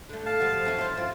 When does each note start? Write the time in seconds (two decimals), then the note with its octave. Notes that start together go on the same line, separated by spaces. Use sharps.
0.09 D3 A3
0.26 F5 A5
0.40 F3 G3 F#4
0.65 F2 C#4 E4
0.79 E4 C5
0.97 C4 F4